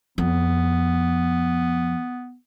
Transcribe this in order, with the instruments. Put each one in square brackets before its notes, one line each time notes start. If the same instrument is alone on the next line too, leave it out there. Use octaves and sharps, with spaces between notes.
[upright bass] F2 [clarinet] B3